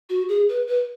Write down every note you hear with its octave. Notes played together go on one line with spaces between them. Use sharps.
F#4
G#4
B4
B4